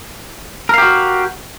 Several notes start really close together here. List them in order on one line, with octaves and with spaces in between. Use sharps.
A#4 F5 G4 F#4